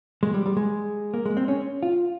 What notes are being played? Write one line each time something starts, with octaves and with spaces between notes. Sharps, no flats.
G#3
G3
G3
G#3
A#3
G#3
C4
C#4
F4